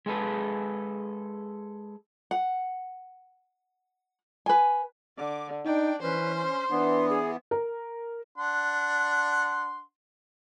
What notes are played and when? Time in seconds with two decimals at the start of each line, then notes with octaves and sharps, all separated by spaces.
0.06 G#3 G#4 A4 B4
2.31 F#5
4.46 B4 G#5
5.18 D3 D6
5.65 D4 D#4 G5
6.02 E3 C#4 B4 C5
6.36 C6
6.70 E3 B3 D4
7.09 G#4
7.51 A#4
8.38 D4 F#5 C6